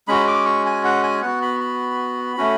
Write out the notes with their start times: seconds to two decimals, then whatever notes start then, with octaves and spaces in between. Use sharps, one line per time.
0.08 G#3 C#4 F#4 B5
0.28 D6
0.46 C#6
0.66 G#5
0.84 F#5
1.03 G#5
1.22 B3 F#4 F#5
1.42 B5
1.61 B5
2.37 A3 C#4 F#4